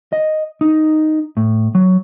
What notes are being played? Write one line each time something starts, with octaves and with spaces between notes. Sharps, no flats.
D#5
D#4
A2
F#3